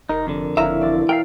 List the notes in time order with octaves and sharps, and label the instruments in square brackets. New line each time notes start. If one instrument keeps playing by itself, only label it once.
[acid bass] F1 [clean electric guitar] D#4 [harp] A#4
[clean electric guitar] F2 D3
[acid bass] F#1 [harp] E4 C#5 F5 [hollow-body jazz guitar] E5 A#5
[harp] E1 D5 A6
[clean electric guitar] A#4 E5 F5 [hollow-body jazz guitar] G5